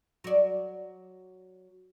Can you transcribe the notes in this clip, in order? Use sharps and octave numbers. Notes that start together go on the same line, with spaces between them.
F#3 D5